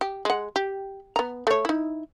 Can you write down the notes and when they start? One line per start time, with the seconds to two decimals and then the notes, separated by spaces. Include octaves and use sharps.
0.01 G4
0.25 G#3 F#5
0.56 G4
1.16 B3 A#5
1.47 A3 C#5
1.65 D#4 E4